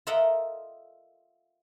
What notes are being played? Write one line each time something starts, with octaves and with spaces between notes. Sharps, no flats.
F4 A4 A#4 D#5 E5 F#5